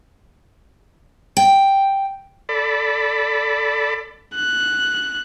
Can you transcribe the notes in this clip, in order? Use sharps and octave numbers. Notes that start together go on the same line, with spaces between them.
G5
A4 D5 B5
F#6